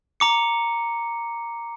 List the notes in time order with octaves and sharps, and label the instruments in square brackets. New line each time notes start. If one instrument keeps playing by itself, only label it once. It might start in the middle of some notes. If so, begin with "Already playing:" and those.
[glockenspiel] A#5 D6 C#7